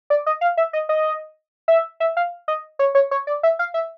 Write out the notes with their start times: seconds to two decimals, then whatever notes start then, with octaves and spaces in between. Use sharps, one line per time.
0.10 D5
0.26 D#5
0.41 F5
0.57 E5
0.73 D#5
0.89 D#5
1.68 E5
2.00 E5
2.17 F5
2.48 D#5
2.79 C#5
2.95 C#5
3.11 C#5
3.27 D5
3.43 E5
3.59 F5
3.74 E5